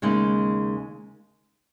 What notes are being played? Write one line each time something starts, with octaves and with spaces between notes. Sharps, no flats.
D#2 C#3 G#3 D#4